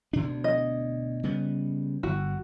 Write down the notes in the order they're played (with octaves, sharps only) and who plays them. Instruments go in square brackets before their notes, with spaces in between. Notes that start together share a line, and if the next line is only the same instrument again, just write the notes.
[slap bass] D2 B2 D4
[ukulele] D#5
[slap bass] C#3 G3 B3
[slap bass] G1 [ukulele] F#4